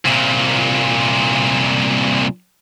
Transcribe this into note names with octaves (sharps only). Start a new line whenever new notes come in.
C2 A#2